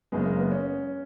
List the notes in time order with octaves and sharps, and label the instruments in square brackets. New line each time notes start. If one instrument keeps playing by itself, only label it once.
[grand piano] F#1 F#2 C#3 G#3 [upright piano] B3
[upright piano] A#3
B3
C#4